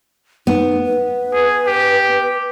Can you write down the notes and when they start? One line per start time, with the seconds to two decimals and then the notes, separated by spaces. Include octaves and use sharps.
0.47 B3 D#4
0.85 B4
1.33 G#4
1.66 G4